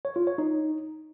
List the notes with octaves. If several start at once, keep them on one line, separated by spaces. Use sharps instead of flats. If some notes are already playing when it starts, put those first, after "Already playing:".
C#5
F4
C#5
D#4